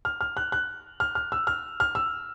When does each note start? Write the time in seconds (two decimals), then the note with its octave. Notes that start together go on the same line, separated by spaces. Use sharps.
0.05 F6
0.21 F6
0.37 F#6
0.52 F#6
1.00 F6
1.15 F6
1.32 E6
1.47 F6
1.80 F6
1.95 E6